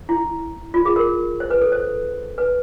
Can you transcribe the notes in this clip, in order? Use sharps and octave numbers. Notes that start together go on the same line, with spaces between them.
E4
F4
G#4
A#4
C5
B4
A4
C5
B4